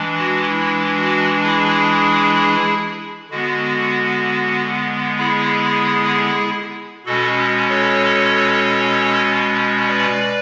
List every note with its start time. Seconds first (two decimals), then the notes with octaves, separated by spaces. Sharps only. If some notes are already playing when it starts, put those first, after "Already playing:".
Already playing: E3 G#3 D4
0.18 F#4
0.50 E4
0.96 F#4
1.43 E4 G#4
3.30 D3 G#3 B3 F#4
5.18 E4 G#4
7.06 B2 G#3 C#4 F#4 A4
7.69 A4 C#5
9.87 B4 D5